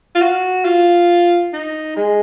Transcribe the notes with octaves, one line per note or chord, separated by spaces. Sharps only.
F4
F#4
F4
D#4
G#3